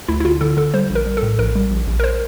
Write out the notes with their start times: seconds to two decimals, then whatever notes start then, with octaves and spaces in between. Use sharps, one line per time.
0.08 D2 E4
0.20 E4
0.25 D3 F4
0.41 D3 A4
0.57 D3 A4
0.74 G3 C5
0.90 A#1
0.95 A#4
1.06 G3
1.17 A4
1.22 A2
1.38 A#1 A#4
1.55 G3
1.71 A#1
1.87 A#1
2.00 A#4
2.04 C5